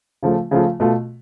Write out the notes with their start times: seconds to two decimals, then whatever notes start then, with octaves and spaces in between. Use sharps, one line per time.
0.23 C#3 F3 A3 F4
0.51 C#3 F3 A3 F4
0.80 B2 A3 F4